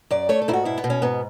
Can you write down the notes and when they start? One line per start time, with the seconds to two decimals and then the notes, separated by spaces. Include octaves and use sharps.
0.11 F#2 D5
0.29 A3 C#5
0.42 A4
0.48 G#2 E4
0.53 F#4
0.65 B2 E4
0.78 B3
0.84 B2
0.90 C#4
1.02 G#2 B3